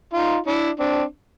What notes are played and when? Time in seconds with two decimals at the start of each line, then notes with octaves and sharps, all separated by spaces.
0.13 D#4 F4
0.47 D4 E4
0.79 C4 D4